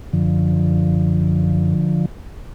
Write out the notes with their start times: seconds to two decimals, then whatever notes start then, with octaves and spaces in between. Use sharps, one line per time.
0.13 F#2 D3 F3